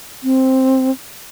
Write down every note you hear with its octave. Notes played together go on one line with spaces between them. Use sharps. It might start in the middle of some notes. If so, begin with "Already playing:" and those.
C4